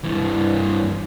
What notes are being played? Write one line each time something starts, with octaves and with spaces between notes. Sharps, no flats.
G2 E3